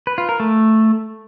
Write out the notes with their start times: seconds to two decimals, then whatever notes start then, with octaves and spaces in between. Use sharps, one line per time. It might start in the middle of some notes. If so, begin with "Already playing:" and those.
0.07 B4
0.18 F4
0.29 A#4
0.40 A3